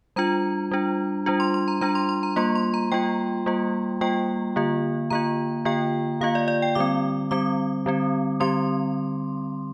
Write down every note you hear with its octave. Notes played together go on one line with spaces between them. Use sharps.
G3 D4 F4 A#5
G3 D4 F4
G3 D4 F4
C6
C6
A#5
G3 D4 F4 A#5
C6
C6
A#5
G3 A#3 F4 C6
C6
A#5
G3 A#3 F4 G5
G3 A#3 F4
G3 A#3 F4 G5
D3 A#3 F4
D3 A#3 F4 A#5
D3 A#3 F4 G5
D3 A#3 F4 F5
D5
D5
G5
D3 G3 C4 D6
D3 G3 C4 D6
D3 G3 C4
D3 G3 C4 C6